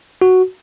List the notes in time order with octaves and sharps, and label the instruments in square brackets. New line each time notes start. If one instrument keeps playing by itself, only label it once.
[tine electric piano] F#4